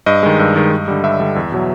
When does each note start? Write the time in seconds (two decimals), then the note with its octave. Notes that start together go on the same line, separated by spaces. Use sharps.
0.06 G2 D#5
0.23 D#3 G#3
0.39 G2
0.56 D#3 G#3
0.72 G2
0.88 D3 G3
1.04 G2 E5
1.20 D3 G3
1.36 E2
1.52 B2 F#3